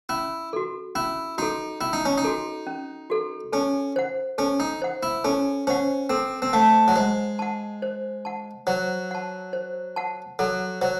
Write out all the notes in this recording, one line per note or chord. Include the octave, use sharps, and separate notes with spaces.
C#4 E4
F#4 A4
C#4 E4
D#4 F#4 A4
C#4 E4
D#4
C#4
D#4
F#4 A4
C#4
F#4 A4
C#4 A4
C5 F#5
C#4 A4
D#4
C5 F#5
E4
C#4 A4
C#4 C5 F#5
C4 A4
C4
A3 C5 F#5
F#3
G#3 C5
F#5 A5
C5
F#5 A5
F#3 C5
F#5 A5
C5
F#5 A5
F#3 A4
F#3 C5